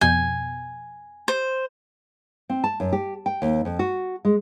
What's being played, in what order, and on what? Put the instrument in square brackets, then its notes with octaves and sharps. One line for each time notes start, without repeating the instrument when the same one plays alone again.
[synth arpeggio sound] F2 B2 G6 [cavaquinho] G#5
[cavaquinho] C5
[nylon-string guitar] C4
A5
F#2
G4
G5
D#2
F2
F#4
G#3